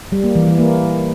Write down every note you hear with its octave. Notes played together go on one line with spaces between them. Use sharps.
G3
A#3
E3
E3
A#3